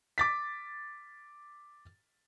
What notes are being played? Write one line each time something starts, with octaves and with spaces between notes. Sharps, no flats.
D6 A6 B6